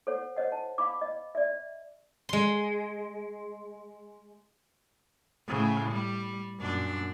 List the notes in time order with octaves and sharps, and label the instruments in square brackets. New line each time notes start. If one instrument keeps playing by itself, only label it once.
[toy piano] A4 C5 C#5 F#5
C5 C#5 D#5 F#5
A5
F5 B5 D6
D#5
D5 E5
[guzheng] G#3 C6
[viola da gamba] A2 C#3
G3
F#2 A#2 D4